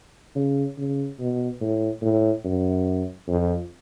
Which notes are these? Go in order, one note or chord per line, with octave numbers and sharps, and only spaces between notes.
C#3
C#3
B2
A2
A2
F#2
F2